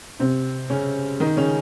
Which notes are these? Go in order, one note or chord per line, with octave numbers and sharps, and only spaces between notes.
C3 C4
C#3 C#4
D#3 D#4
C#3 C#4